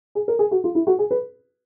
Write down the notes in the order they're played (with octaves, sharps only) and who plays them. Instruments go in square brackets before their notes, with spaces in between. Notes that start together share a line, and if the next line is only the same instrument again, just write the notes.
[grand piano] G#4
A#4
G#4
F#4
F4
E4
F#4
G#4
B4